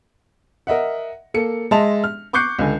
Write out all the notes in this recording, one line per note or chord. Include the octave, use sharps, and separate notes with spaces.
A#4 D#5 E5 F#5
A#3 A4 C#7
G#3 D#5 E5 A5 C6 F7
F6
C#6 D6 F#6 G6 C7 C#7
C#2 D3 G#5